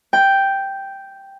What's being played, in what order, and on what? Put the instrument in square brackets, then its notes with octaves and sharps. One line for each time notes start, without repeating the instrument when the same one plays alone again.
[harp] G5